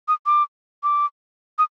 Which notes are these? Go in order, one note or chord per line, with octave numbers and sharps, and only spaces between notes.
D#6
D6
D6
D#6